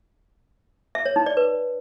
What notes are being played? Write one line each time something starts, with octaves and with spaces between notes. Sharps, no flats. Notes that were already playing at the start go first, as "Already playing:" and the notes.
E5
C#5
D#4
D5
B4